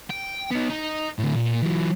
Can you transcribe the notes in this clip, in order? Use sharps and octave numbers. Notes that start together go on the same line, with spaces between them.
G5
B3 D#4
D#4
D2 A2
A#2
E3 F#3